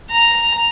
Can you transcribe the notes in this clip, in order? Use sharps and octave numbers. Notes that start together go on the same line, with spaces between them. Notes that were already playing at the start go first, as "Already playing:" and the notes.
A#5